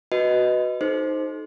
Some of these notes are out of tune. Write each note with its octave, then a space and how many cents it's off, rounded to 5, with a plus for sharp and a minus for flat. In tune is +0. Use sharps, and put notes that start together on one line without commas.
F#4 +5 B4 +0 D#5 +0
D#4 +0 A4 -25 C5 +0